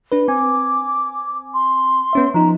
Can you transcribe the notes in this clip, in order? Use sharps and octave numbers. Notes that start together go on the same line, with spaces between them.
D4 B4
C4 G#5 D6
C6
B3 C#4 E5
F3 D#4 A#5